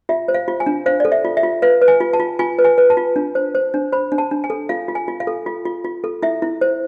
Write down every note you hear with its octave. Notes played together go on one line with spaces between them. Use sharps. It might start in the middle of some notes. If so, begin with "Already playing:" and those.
F4 E5
C5
F5
F4
G#5
D4
C5 F5
A4 D5
E5
F4
E5
F4
B4 F5
B4
G#5
F4
A5
F4
F4 G#5
B4
G#5
B4
A5
F4
D4
C5
C5
D4
C5 B5
D4
A5
D4
G#5
A4
F4 F5
F4
G#5
F4
F5
A4
F4
F4
F4
A4
E4 E5
E4
C5